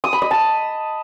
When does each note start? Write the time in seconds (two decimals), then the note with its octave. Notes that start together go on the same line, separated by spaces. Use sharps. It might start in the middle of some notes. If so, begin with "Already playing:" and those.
0.04 D#6
0.13 B5
0.22 D#5
0.31 A5